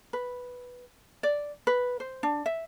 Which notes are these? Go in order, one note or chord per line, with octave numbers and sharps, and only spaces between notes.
B4
D5
B4
C5
D4
E5